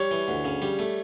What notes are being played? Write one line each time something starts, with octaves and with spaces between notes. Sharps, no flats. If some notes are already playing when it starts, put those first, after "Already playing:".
Already playing: G3 C#5
E3
D2
C#3
G3
A3